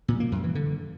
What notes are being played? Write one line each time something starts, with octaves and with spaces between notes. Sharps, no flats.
A#2
A#3
F#2
E3
D3